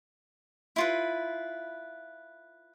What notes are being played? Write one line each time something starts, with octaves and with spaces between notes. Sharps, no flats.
E4 F4 B4